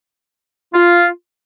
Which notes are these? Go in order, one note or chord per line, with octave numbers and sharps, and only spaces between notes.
F4